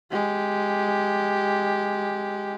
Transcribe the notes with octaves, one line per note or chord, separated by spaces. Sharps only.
G#3 G4